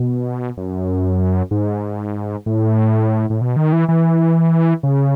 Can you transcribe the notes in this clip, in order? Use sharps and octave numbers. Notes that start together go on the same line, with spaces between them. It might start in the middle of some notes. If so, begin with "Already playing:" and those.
Already playing: B2
F#2
G#2
A2
A2
B2
D#3
E3
E3
C#3